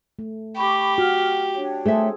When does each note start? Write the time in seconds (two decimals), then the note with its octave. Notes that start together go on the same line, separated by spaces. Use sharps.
0.19 A3
0.57 G4 B5 C#6 D6
0.98 F#4 F6
1.56 D4 C#5 G5
1.86 A3 G#4 A4 C5 E5